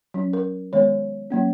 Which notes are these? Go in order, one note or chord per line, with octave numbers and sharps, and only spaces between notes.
F#3 C#4
A#4
D#3 G#3 B3 C#5
F#3 A#3 C#4